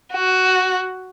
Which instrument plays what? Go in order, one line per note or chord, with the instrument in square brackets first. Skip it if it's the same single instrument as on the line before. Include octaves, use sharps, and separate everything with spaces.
[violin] F#4